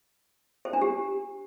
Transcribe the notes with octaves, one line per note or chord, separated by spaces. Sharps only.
C5
D4
G4